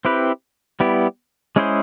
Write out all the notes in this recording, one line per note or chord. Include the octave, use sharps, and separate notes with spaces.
C4 E4 G4 B4
G3 B3 E4 G4
G#3 C#4 E4 G#4 C5